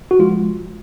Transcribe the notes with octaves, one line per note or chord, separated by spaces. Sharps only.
F#4
F3 G#3 F4